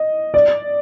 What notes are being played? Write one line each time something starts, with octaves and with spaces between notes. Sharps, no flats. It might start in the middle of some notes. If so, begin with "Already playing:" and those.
Already playing: D#5
D5